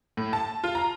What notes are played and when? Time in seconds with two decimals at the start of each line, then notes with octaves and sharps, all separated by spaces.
0.17 A2
0.33 A5
0.64 F4
0.75 A#5